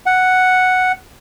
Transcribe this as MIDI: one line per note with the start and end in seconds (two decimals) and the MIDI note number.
0.06 0.92 78